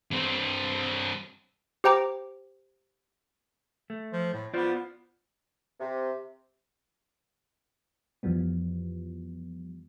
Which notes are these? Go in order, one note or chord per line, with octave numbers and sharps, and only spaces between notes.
G2 C4
G4 C5 G5 A#5 D6
A3
F3
A2
B3 F4 C5 D5
C3
F2 E3 F3 G3 B3